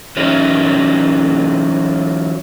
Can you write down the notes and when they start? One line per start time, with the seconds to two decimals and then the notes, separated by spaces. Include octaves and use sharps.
0.17 E3 F#3 C#4 D#4 E4